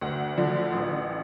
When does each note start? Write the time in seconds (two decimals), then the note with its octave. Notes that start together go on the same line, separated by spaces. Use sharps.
0.01 D2 F#5
0.38 D3 F3
0.73 A1